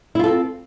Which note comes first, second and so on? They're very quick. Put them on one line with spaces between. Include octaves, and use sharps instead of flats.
E4 F4 A4 C4